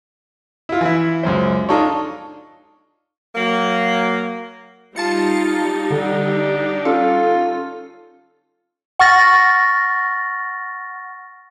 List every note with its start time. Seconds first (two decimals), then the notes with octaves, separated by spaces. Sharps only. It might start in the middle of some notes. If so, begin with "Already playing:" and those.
0.69 E4 F4
0.81 E3 E4
1.23 C#2 F#2 C5
1.69 D4 D#4 F4 A4 C#5
3.34 F#3 A#3
4.96 G3 D#4 F4 A5 A6 C#7
5.91 D3 D4
6.85 C#4 F4 A4
8.99 F#5 C#6 F6 A6 A#6